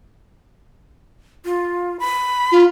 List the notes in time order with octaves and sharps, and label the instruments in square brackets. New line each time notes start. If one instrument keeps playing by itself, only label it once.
[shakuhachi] F4
B5
[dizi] F4